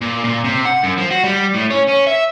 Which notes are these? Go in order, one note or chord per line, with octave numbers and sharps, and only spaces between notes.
A#2
A#2
C3
F#5
F#2
F3
F#4
G3
A2
C#4
C#4
E5